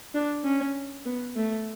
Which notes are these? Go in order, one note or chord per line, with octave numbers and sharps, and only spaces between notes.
D4
C#4
B3
A3